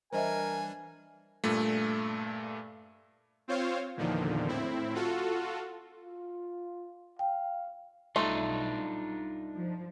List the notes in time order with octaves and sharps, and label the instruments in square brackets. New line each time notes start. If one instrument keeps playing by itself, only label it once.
[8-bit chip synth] E3 G3 D4 [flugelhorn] A#4 [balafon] C5 D#5 E5 [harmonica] G#5
[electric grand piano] G2 A#2 A3
[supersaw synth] C4 F4 C5 C#5 F5
E2 A#2 D3 D#3 F3
A2 C4 E4
F4 F#4 A4
[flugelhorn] F4
[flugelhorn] F5 [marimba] G5
[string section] B1 [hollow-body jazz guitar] G2 C6 [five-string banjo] A3 [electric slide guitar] D4 D#4 F4
[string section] F3